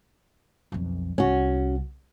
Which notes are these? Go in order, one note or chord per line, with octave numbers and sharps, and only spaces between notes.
B1 F2
C2 C#4 F#4